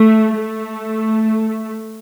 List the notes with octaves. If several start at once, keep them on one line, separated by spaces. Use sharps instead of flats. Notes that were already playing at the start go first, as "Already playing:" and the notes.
Already playing: A3
A3